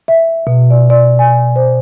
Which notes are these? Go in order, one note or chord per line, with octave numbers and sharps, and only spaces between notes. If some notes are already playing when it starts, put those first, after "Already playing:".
E5
B2
D5
D5
G#5
C5